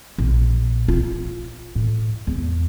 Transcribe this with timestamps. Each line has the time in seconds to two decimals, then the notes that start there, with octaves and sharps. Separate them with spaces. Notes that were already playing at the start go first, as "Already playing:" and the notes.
0.18 A#1
0.88 F4
1.76 A2
2.27 E2